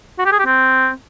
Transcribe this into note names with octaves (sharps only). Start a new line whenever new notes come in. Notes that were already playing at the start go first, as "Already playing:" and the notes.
F#4
G4
G#4
G4
C4